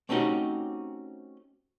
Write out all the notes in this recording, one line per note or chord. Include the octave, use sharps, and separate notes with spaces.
A3 C4 C#4 D#4 F#4 G4